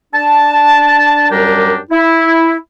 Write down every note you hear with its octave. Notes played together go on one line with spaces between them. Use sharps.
D4 A5
F#2 G3 D4 G4 A#4
E4